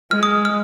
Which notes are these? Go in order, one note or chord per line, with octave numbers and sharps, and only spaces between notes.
G#3 F6
D#6
F6